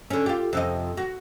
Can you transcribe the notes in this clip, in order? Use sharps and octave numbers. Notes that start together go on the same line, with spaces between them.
D3 C#4
F4 G4
F2 C3 D#5
F#4